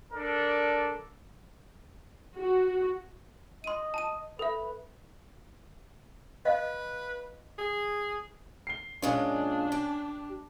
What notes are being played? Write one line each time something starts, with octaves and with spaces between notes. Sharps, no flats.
D4 A4 A#4 D5
F#4
D#5 C6 D#7
A5 D#7
A4 B4 E5
B4 D#5 F5
G#4
C7 G7
A#2 G#3 C#4 D4 F4
G4